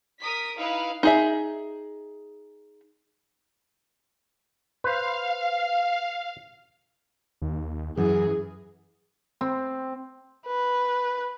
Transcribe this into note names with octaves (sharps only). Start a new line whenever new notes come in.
A#4 D#6 B6
D#4 E4 B4 F5
D#4 G#4 E5
B4 C5 F5
D#2
F#2 E3 G#4
C4
B4